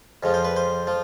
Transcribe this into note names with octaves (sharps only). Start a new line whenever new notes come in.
F2 C#3 F3
C5
B4
C5
F3